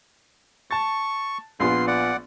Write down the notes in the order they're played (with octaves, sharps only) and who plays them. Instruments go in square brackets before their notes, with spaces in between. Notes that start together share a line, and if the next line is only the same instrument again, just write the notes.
[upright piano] A5 A6 [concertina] C#6
[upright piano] A#1 B3 F4 [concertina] C6
[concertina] D5 F#5